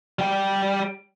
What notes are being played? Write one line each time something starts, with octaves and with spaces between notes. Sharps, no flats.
G3 G5